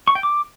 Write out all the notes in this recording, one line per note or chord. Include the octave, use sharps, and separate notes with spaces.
C#6
G5
D6